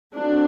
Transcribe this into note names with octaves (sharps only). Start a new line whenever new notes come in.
F#3 A3 C4 D4